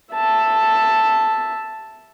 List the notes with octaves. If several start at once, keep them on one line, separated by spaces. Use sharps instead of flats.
E5 A5